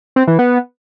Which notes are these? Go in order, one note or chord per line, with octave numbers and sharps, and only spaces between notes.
C4
E3
B3